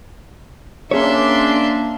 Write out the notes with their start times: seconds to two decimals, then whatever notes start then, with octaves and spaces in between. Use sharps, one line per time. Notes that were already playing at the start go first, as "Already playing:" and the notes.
0.91 A#3 C#4 D4 G#4 C#5 E5 C6